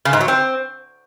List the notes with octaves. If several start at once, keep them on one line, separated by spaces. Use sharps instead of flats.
C#3
G#2
F#3
C4